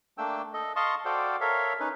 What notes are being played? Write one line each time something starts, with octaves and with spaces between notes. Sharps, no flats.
A3 A#3 D4 G5 E6
A4 D#5
D#5 F5 A5 C6 C#6 D#6
F#4 A4 C5 D5 F5 G5
A4 A#4 C#5 E5 F5
C#4 D#4 B4